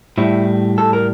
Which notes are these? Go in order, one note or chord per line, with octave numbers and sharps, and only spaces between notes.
A2 G3 E4
A4
A#4